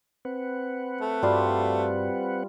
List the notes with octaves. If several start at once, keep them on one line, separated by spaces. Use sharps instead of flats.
C4 B4 F#5
A3
G2 G3 F4 F#4 D5 F5